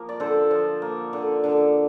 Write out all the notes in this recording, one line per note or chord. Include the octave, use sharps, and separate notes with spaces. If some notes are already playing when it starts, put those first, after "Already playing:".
Already playing: F3 A#3 A#4
D5
D3 A4 C5
F3
A#3
D3
D3